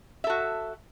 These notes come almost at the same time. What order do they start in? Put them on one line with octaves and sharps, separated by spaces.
E5 A4 F#4